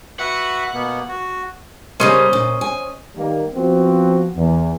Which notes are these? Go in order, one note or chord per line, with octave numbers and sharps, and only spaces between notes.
F#4 B4 E5 F#5
B2 A#3 B3
F#4
C#3 G3 A#3 C#4 C5 D#5
A#2
G#5
D#3 G3 A#3
F3 B3 C4 F#4
E2